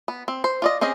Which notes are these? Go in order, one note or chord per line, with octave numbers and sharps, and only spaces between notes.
B3
C4
C5
F4 D5 D#5
C4 C#4 G4 G#4 D#5